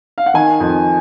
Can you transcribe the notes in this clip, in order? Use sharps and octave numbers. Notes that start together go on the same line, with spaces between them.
F5
F#5
D#3 G#5
F2